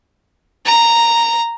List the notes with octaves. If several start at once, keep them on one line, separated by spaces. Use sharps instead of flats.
A#5